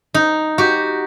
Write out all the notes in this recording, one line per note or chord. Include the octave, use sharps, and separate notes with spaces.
D#4
F#4 G4